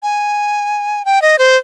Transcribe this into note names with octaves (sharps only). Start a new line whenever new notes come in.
G#5
G5
D#5
C5